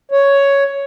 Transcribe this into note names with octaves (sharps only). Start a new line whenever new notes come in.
C#5